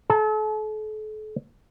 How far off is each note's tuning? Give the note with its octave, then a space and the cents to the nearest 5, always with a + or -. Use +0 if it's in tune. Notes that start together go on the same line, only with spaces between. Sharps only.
A4 -40 A5 +40